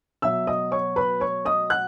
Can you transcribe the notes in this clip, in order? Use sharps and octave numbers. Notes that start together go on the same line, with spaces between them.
B2 F#3 E5 E6
D#5 D#6
C#5 C#6
B4 B5
C#5 C#6
D#5 D#6
F#5 F#6